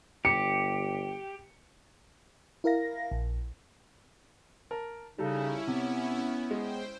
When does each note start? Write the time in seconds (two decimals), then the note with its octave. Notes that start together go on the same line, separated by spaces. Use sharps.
0.25 G1 G4 C#7
2.64 E4 A#4 F5 A#6
3.12 A#1
4.71 A#4 A5
5.18 C#3 G3 C#4 D#4 E4 A4
5.67 C3 B3
6.51 G#3 C5 G5